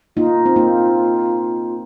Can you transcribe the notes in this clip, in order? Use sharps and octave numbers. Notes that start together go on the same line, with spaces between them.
A#3 D#4 F4
C4
A#3 D#4